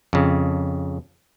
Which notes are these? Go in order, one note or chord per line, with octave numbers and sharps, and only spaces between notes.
F2 C#3